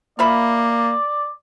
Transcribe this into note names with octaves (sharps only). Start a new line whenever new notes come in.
A#3 F4 D5 E5 B5